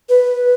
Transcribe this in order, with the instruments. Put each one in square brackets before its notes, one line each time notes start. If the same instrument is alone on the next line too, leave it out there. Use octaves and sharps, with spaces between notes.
[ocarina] B4